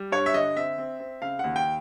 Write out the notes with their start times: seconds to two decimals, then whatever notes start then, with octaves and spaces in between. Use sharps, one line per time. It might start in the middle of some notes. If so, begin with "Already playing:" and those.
Already playing: G3
0.12 G2 C#5
0.26 E5
0.34 D3 D#5
0.56 C4 E5
0.78 C4
1.00 C4
1.22 C#3 F5
1.39 D#2 F#5
1.56 G5